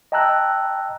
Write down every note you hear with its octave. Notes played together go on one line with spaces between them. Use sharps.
D#5 G5 A5 A#5 E6 F#6